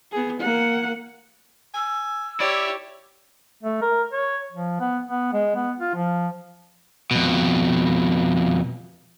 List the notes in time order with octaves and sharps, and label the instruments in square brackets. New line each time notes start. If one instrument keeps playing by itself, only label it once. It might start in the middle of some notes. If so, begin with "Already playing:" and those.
[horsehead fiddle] B3 G#4
A#3 F#5
[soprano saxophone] G#5 [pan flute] E6
[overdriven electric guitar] E4 [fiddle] G4 C#5 [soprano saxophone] D5
[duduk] A3
A#4
C#5
F3
B3
B3
G#3
B3
F4
F3
[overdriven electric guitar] F2 B2